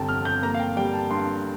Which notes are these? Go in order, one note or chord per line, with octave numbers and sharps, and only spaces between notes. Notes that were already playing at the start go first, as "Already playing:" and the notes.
Already playing: G1 C3 G5 A5 A#5
F2 F6
G6
A#3 A#5
F5
G5
G3 G5
A5
G2 C6